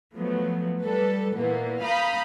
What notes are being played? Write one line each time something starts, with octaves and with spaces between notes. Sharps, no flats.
F3 F#3 A3 B3
G3 A4 B4
A#2 E3 A#3 B3
F5 A#5 B5 D#6 G6